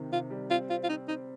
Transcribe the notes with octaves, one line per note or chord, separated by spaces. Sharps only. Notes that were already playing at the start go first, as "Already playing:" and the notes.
Already playing: C3 D#3
C3 F4
G3
C4 F4
C4 F4
F4
C4 D#4
C4 D#4